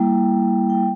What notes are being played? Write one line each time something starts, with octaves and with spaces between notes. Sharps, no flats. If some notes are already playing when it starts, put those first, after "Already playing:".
Already playing: G3 A#3 E4 G5
G5